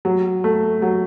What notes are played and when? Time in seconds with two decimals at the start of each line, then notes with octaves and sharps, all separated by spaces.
0.05 F#3
0.44 A3
0.82 F#3